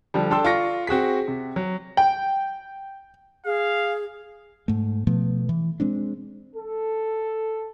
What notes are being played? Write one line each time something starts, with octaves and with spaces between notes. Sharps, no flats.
D3 F3 G3
D4 A4 G5 C6 E6
F4 D5 C#6 A#6 C#7
C4 F#4 G#4 B6
C3
F#3
G5
G#4 F5
G#2 A3
B2 F3 A3 B3
E3
G#3 C4 D4
A4